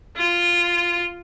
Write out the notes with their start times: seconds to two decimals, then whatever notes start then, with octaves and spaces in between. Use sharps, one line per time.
0.17 F4